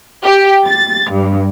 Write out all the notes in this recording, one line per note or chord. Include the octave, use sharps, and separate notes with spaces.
G4
A6
G2